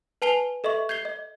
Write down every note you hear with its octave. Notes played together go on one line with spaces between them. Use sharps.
B4 G#5 A5 C7 F7 G7
A4 D#5 E5 C#6
G6 G#6 C7 G7
D#5